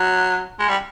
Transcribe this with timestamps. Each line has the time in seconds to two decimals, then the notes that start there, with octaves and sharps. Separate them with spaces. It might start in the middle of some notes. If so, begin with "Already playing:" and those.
Already playing: F#3
0.59 G#3
0.68 G3